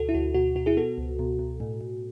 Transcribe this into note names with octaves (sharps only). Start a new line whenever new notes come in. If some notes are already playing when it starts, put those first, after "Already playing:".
Already playing: D2 B2 F#4 A4
E4
D2 F#4
B2 F#4
B2 F#4
E4 G#4
B3 F#4 A4
C#2
B2
B2
A2
A2